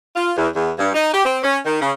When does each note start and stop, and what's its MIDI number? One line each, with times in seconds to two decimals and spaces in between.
0.16 0.31 65
0.37 0.48 40
0.55 0.71 40
0.78 0.89 43
0.94 1.10 63
1.13 1.24 67
1.25 1.38 60
1.43 1.58 61
1.66 1.80 51
1.81 1.91 49